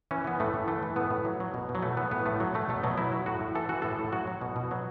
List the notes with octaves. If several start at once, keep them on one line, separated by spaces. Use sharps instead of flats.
E3 C#4
E3 B3
A2 A3
A2
E3 A3
E3
A2 B3
A2
F#3
F#3
B2
B2
F#3
E3 A3
E3 B3
A2 B3
A2 A3
F#3
F#3 A3
B2 A3
B2 F#3
F#3 E4
F#3
A2 F#4
A2
E3 A4
E3 F#4
A2 A4
A2
F#3 F#4
F#3
B2
B2
F#3